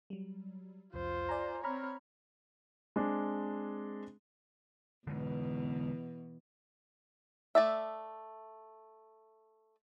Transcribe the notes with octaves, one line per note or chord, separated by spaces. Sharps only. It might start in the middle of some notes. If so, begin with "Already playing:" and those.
F#3 G3
C2 F2 F4 C5
D5 G#5 A#5
C4 C#5 A#5 B5 F6
G#3 C4 D4
E2 B2 D3 G#3 B3
A3 D5 E5